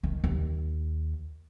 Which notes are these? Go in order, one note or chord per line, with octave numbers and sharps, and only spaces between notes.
D#3
D#2